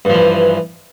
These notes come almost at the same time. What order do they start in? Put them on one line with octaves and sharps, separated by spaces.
G2 F3 E3